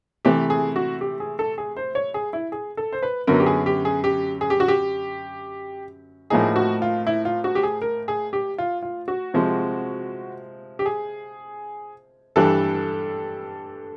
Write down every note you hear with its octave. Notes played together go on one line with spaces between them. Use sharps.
C3 E3 A3 G4
G#4
F#4
G4
G#4
A4
G#4
C5
C#5
G#4
E4
G#4
A4
C5
B4
F#2 D3 F#3 B3 A#4
G4
G#4
G4
G#4
G4
G#4
G4
F#4
G4
A2 F3 A#3 D#4 G#4
F#4
F4
E4
F4
F#4
G4
G#4
A#4
G#4
G4
F4
F4
F#4
C3 F3 G#3
G4
G#4
G2 E3 G3 A4